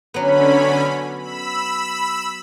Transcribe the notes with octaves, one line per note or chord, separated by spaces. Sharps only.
D3 F#3 B3 C#4 B5
B5 E6